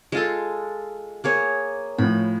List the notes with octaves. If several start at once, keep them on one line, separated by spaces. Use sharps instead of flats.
G#3 F4 A4
A#3 G#4 C#5
A2 F3 B5